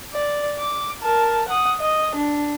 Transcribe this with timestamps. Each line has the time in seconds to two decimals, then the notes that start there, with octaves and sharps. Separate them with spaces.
0.14 D5
0.59 D6
1.02 A#4 A5
1.48 F#5 D#6
1.80 D#5
2.16 D4